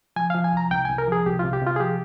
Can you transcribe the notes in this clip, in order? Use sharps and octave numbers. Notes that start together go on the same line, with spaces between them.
F3 G#5
F3 F5
G#5
C2 A#5
C2 G5
C2 G#5
A#4
F3 G#4
C2 G4
F4
C3
G4
C3 F4
G#4
F3 G4